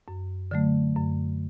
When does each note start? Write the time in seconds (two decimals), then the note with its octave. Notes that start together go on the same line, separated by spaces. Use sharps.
0.08 F#2
0.51 D3 F#3 A3
0.96 F#2